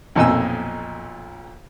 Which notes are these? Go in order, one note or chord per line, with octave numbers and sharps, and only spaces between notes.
B1 F2 A#2 D#5 G#5 E6